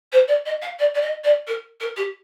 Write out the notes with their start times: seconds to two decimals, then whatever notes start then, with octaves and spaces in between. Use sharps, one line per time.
0.12 C5
0.28 D5
0.45 D#5
0.61 F5
0.79 D5
0.94 D5
1.01 D#5
1.24 D5
1.47 A#4
1.80 A#4
1.96 G4